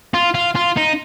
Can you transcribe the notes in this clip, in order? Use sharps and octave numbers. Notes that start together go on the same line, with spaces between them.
F4
F4
F4
D#4